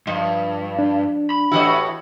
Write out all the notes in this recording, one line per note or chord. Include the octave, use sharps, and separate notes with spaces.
G2 F3 D#5
D4
B5
A2 E3 E4 F#4 G4 D#5